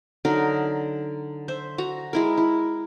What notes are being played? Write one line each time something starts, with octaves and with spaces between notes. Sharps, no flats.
D3 F#3 D#4 A#4
C5 E5
F#4 A#5
G#3 E4 A#4
E4